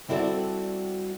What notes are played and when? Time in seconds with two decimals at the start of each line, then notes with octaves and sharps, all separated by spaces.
0.08 G3 C4 E4 F#4 A4 D5